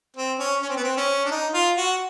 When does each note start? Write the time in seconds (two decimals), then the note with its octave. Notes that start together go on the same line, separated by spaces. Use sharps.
0.16 C4
0.39 C#4
0.62 C#4
0.69 C4
0.77 B3
0.84 C4
0.97 C#4
1.25 D4
1.31 D#4
1.54 F4
1.77 F#4